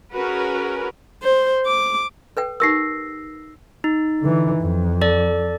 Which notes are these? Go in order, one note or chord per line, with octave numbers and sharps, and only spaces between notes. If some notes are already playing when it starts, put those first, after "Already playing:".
C#4 F#4 G#4 A#4 B4
C5
D6
A4 B4 G5
D#4 G4 A#4 E6 A#6 C7
D#4
D3 E3
F2
A4 D5